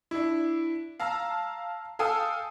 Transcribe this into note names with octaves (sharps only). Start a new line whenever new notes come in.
D4 E4
F5 A5 A#5 E6
A4 F5 G5 G#5 D#6 E6